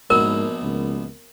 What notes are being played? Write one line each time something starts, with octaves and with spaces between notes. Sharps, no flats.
A#1 G#2 B2 A#4
C#2